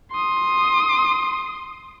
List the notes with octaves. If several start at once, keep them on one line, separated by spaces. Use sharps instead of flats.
C6 D#6